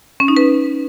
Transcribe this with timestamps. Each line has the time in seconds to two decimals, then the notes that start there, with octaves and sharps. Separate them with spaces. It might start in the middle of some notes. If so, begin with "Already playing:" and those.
0.20 C#4
0.28 D#4
0.37 B4